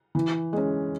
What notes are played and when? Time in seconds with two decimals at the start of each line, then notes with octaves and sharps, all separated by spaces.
0.15 E3
0.53 G#3 C#4